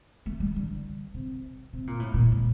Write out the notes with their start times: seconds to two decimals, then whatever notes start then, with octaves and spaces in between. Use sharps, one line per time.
0.26 A3
0.40 G3
0.56 D3
1.14 C3
1.73 C3
1.87 A#2
2.00 A2
2.14 A#2
2.32 A#2